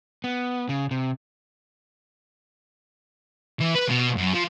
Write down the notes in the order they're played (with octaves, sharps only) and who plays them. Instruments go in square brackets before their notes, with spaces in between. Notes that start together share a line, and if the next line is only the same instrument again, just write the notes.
[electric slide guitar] B3
C#3
C3
[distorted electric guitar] E3
B4
B2
F#2
F3